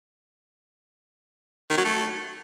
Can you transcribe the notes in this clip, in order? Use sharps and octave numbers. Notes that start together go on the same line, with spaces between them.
D#3
F#3
A3